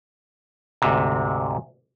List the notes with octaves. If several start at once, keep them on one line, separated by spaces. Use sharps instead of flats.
D2 G#2 C3